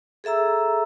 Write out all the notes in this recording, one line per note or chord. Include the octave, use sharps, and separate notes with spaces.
G#4 A4 E5 A#5 E6